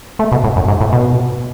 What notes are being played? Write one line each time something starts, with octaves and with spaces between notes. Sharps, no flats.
A3
B2
A2
F#2
G#2
A2
B2